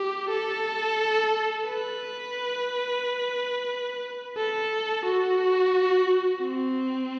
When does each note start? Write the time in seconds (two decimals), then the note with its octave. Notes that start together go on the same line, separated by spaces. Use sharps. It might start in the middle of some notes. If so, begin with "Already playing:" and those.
Already playing: G4
0.30 A4
1.66 B4
4.38 A4
5.06 F#4
6.42 C4